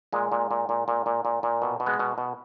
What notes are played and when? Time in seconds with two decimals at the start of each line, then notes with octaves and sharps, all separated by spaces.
0.13 A#2 G#3
0.32 A#2
0.51 A#2
0.69 A#2
0.88 A#2
1.06 A#2
1.25 A#2
1.43 A#2
1.62 B2
1.80 B2
1.86 G#3 B3
1.99 B2
2.18 B2